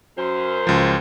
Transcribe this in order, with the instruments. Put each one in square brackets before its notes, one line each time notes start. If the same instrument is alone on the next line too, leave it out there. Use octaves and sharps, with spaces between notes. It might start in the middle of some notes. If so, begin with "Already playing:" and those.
[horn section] F#2 C5
[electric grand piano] C#2 F3